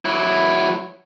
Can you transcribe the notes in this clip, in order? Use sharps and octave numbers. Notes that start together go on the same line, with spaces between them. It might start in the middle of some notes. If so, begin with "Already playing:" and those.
F#3 E4